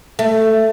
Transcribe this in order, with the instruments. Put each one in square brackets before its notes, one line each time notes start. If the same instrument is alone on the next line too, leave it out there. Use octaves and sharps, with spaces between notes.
[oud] A3